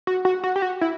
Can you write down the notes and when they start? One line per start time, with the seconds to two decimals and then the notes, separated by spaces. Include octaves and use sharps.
0.07 F#4
0.25 F#4
0.44 F#4
0.56 G4
0.62 F#4
0.81 E4